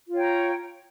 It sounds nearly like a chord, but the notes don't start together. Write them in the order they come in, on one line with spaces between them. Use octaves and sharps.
F4 C#5 G5 A#5